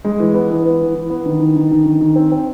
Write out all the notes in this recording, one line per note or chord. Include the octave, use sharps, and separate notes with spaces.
G#3
E3
B3
E3
B3
E3
E3
B3
D#3
D#3
D#3
D#3
D#3
D#3
C4
C4